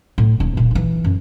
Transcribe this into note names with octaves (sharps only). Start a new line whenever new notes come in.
A2
D#1 D#4
A#2
E3 D#4
F#2